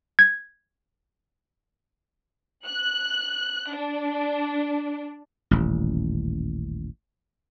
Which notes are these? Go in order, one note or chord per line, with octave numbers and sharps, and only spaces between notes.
G#6
F#6
D4
D#1 A1